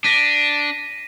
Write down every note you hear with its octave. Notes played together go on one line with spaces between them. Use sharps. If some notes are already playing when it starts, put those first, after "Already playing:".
D4 A#6 B6 D#7